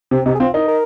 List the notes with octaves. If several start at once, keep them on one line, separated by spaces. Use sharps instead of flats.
C3 C4
C3 D#4
G#4
C4 F4
D#4 A#4
A#4